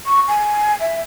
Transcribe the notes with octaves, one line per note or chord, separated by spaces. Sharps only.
C#6
G#5
E5